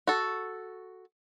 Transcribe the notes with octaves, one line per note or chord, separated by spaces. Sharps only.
F#4 A4